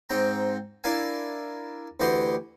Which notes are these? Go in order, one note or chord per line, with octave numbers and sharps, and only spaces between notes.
G#2 C4 G5 A#5
D4 E4 A#4 F5 G#5
D2 E3 G4 D#5 F#5 C6